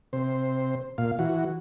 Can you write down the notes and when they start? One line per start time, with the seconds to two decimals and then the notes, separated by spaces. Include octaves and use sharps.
0.13 C3 C5
0.98 A#2 F5
1.19 E3 F#4